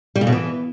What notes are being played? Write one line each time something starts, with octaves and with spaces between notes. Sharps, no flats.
G3
C#3
B2
E3